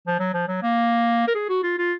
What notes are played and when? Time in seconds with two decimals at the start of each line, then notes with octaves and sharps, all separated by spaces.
0.07 F3
0.20 F#3
0.34 F3
0.48 F#3
0.63 A#3
1.27 A#4
1.35 G#4
1.49 F#4
1.63 F4
1.78 F4